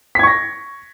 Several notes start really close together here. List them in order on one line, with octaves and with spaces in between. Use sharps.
B6 G#6 C#6 A#6